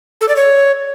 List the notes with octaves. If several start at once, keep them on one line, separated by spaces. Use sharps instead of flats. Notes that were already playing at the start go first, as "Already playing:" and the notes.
A4
D5
C#5